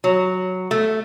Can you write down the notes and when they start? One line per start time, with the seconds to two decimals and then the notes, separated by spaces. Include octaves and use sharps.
0.04 F#3
0.71 A3